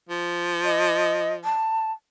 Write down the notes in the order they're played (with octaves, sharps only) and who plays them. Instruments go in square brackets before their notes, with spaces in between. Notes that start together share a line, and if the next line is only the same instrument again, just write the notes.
[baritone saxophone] F3
[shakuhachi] D#5
A5